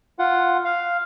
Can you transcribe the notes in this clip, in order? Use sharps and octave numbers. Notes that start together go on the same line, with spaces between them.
F4 F#5
F5